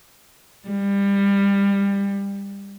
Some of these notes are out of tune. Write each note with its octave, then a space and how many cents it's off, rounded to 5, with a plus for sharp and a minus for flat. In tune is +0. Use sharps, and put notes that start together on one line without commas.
G3 +25